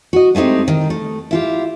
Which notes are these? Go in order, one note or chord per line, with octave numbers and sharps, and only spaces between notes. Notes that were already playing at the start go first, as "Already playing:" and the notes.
F#4 D#5
G#3 A3 C4 D#4 G4
D#3
A3
E4 F4 G4